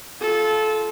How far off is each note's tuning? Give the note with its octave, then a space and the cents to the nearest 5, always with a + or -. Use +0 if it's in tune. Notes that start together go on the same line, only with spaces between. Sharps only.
F4 +0 A4 -25